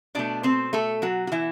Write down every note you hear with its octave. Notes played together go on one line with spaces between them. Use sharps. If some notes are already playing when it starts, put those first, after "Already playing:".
B2 A3 D4 D5
C4 C5
A3 A4
F#3 F#4
F#4
E3 E4